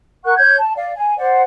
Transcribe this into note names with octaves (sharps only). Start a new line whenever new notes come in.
A#4 F#5 C#6 F#6
C#5 G6 G#6
A5
D5 F5
G#5
C5 D5 F#5